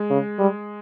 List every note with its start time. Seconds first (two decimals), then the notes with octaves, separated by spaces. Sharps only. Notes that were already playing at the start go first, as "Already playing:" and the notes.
Already playing: G#3
0.10 C#3
0.38 G3